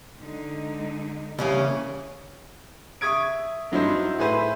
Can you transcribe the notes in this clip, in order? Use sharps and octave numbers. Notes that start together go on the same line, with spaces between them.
D3 G#3 D#4
C2 C#3 E3 A#3 C#4
E5 C#6 D#6 G#6 D7
G2 F#3 D#4 E4 C5
A2 G#4 B4 C5 E5